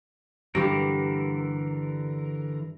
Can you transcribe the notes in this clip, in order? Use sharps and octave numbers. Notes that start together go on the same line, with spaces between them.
G2 D3 E3 G4 A#4